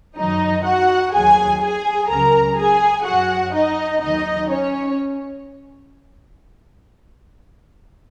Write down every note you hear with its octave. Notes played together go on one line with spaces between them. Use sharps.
F#2 D#3 F#3 D#4 D#5
F#4 F#5
D#2 D#3 F#3 G#4 G#5
G#4 G#5
C#2 C#3 F#3 A#4 A#5
G#4 G#5
F#2 F#3 F#4 F#5
D#4 D#5
D#2 D#3 F#3 D#4 D#5
C#4 C#5